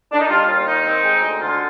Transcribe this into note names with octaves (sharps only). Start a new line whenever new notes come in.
D4
D#4
G3 F4
D#2 F4
D#3 D#4
C4
G#3
D2
D3 F4